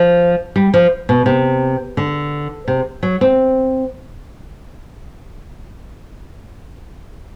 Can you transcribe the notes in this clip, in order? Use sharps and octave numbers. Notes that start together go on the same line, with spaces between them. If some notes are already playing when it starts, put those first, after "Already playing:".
Already playing: F3
G3
F3
B2
C3
D3
C3
F#3
C4